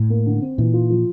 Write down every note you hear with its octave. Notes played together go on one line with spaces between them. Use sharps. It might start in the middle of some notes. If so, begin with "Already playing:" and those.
Already playing: A2
A#3
D3
C4
A#2 E3
F4
F3